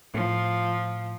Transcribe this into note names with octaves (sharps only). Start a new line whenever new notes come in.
A2 F3